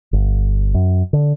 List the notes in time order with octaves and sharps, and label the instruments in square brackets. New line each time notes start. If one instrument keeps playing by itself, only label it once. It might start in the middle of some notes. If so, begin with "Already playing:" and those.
[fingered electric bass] G1
F#2
D3